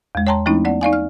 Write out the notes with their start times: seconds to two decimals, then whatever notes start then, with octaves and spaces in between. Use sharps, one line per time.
0.15 E2 G#3
0.27 C#5 G5 A5 A#5 C6
0.46 F3 A3 C4 C#4 D#4 E4
0.65 B3 D5 F#5
0.81 D#4 D5 F5 G#5
0.93 F6